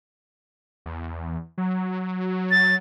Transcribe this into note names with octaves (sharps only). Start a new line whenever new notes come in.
E2
F#3
A6